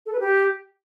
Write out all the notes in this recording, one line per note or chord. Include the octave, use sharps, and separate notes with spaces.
A4
B4
G4